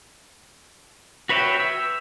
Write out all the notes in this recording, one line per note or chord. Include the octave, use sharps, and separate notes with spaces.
F#4 B4 C#5 E5 G5
E6